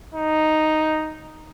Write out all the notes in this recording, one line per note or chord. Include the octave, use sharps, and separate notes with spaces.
D#4